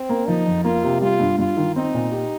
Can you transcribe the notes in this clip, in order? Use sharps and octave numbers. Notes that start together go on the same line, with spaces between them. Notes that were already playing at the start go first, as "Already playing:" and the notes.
Already playing: C4
A#3
F3 D#4
F2
A#3 F4
C3
G3 F4
G2
G2 F4
D#3
C4 D#4
A#2
G4